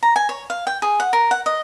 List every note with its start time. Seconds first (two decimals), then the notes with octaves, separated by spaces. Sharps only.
0.03 A#5
0.16 G#5
0.29 C#5
0.50 F5
0.67 G5
0.82 G#4
1.00 F#5
1.13 A#4
1.31 F#5
1.46 D#5